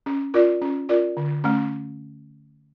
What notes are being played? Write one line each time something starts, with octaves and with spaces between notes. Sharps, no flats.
C#4
F4 A#4 D5
C#4
F4 A#4 D5
D3
A3 C#4